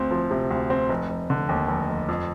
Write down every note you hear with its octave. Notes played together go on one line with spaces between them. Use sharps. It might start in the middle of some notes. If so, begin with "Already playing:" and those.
Already playing: D2 C4
F3
C3
D2
C4
F1
F1
D3
D#2
F1
F1
F2